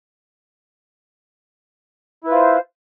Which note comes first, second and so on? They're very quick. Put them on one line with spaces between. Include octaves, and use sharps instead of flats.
E4 B4 F4 C5